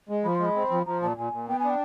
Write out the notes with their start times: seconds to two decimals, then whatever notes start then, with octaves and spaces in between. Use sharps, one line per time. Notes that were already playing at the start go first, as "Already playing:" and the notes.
0.09 G#3
0.24 F3 B5
0.35 C6
0.40 G#3
0.45 B5
0.56 C4
0.71 F3
0.86 F3 A#5
1.02 A#2 A5
1.17 A#2 G#5
1.33 A#2
1.48 B3 G5
1.59 D4 G#5
1.70 G5